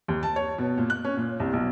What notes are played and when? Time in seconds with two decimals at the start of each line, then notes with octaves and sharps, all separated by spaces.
0.08 D#2
0.23 A5
0.36 C#5
0.58 B2
0.78 A#2
0.90 F#6
1.05 C#4
1.17 A#2
1.40 C2
1.53 B1